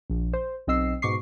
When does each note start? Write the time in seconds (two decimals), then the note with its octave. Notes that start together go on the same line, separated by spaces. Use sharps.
0.10 A#1
0.33 C5
0.67 B1 C4 D#5 E6 C7
1.02 G#2 B2 C#6 D6 C7